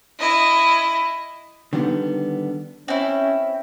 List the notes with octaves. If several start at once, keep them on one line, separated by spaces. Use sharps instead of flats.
E4 D#5
D3 D#3 G3 B3
C4 C#4 E4